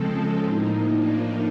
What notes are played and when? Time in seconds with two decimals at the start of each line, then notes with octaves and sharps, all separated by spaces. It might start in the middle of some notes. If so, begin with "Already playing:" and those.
Already playing: C#3 F3 G#3 C4 A4
0.43 A2 F3 A#3 D#4
0.88 D4